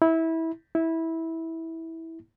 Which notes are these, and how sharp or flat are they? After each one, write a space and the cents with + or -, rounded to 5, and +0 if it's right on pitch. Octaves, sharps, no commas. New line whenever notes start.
E4 -20
E4 -15